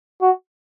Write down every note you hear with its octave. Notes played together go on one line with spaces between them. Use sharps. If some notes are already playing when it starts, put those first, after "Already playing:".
F#4